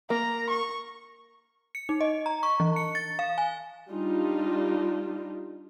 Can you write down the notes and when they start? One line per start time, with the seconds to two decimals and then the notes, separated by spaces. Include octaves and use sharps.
0.10 A#3 A#5
0.50 C#6
1.75 C#7
1.89 D#4
2.01 D#5
2.26 A#5
2.43 C#6
2.60 E3
2.76 C#7
2.95 A6
3.19 F5
3.38 G#5
3.91 G3 D4 D#4 F4